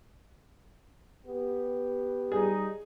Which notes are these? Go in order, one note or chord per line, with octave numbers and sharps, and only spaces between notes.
B3 G4
G3 D#4 G#4